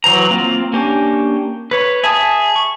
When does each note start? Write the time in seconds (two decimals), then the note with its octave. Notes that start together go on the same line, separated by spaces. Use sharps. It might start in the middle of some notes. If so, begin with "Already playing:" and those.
0.04 E3 F#3 C5 A#5
0.31 A#3 C4 F4
0.73 A#3 C#4 D4 G4
1.71 B4 C#5
2.04 G#4 E5 A5 D#6
2.56 C#6